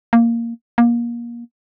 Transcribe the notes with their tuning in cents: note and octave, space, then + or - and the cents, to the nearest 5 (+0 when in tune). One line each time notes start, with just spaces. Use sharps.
A#3 -5
A#3 +25